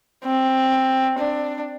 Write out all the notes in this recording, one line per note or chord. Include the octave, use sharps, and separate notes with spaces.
C4
D4